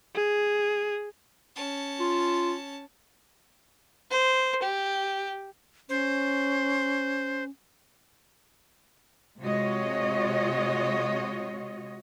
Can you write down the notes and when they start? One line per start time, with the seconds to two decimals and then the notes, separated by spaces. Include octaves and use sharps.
0.14 G#4
1.56 C#4 A5
2.00 F4
4.11 C5
4.62 G4
5.89 C#4 C5
9.41 C3 G#3 F4 F#4 C#5 D#5